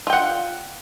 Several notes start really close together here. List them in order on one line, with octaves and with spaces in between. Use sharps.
F4 G5 F#5